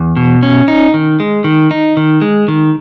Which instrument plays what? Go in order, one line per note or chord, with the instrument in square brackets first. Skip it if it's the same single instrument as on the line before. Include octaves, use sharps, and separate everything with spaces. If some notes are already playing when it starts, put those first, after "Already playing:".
Already playing: [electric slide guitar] E2
B2
C#4
D#4
D#3
G#3
D#3
D#4
D#3
G#3
D#3